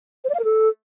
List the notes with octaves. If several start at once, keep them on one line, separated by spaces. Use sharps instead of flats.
C5
D5
F5
A#4
A4